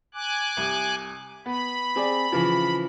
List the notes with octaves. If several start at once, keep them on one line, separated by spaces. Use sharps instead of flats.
G#5 D6 F#6
C2
B3 B5
C4 G#4 D5
C#3 E3 F3